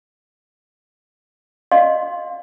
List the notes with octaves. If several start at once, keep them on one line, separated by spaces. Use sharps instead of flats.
D5 D#5 F5 C6